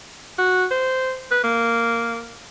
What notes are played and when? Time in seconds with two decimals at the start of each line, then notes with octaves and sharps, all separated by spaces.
0.38 F#4
0.71 C5
1.31 B4
1.44 A#3